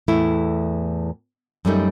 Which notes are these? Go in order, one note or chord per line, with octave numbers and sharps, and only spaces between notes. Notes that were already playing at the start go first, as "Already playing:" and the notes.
E2 A2 A3 E4
F#2 G3 A3 D#4